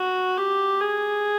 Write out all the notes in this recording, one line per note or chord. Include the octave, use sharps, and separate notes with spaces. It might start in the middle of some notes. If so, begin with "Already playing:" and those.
Already playing: F#4
G4
G#4